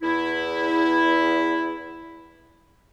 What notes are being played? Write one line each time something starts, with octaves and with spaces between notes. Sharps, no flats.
E2 E4